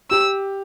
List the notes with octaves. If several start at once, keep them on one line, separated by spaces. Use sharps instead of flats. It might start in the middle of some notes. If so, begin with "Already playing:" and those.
G4 E6